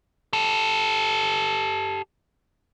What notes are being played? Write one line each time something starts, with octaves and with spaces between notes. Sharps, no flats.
G4 A4